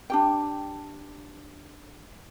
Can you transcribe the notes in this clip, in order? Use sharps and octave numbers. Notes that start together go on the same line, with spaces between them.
D4 G4 G5